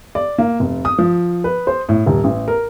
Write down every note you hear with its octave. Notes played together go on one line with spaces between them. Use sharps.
D5
A#3
F1
D#6
F3
B4
C5
A2
D#1
A1
A#4